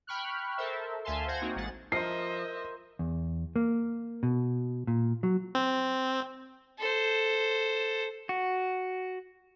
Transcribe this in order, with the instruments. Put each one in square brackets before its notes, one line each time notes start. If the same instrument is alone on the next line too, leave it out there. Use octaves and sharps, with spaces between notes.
[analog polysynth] G5 B5 C#6 F6 F#6
A4 A#4 C5 E5
D2 E5 F5 G#5 A5 C6
C5 F#5 G6 G#6 A#6
A#3 C4 D#4 F#4
A1 G#3 F#5 A6
[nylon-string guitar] F3 [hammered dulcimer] A#4 C5 [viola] D#5 E5 [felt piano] C7
[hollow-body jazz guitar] E2
A#3
B2
A#2
F#3
[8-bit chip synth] C4
[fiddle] A4 C5
[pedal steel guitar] F#4